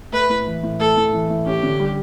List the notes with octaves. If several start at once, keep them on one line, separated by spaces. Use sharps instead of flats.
A3 B4
A2
E3
A2
A3 A4
A2
E3
A2
C#4 G4
D3
G3